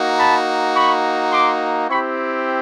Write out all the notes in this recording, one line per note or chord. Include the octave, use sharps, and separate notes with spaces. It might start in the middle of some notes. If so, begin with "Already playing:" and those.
Already playing: A#3 D#4 F#4
A5 B5
B5 C#6
C6 D6
C4 E4 G4 B5 C#6